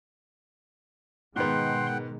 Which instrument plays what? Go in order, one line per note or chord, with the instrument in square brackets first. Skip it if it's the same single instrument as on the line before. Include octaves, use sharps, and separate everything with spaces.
[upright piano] G#2 B3 [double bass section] B2 D#3 G#3 [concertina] F#5 G5 [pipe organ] C6